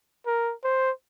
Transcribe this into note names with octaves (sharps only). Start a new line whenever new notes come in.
A#4
C5